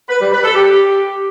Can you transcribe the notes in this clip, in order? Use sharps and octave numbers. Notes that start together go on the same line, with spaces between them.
B4
G3
B4
A4
G4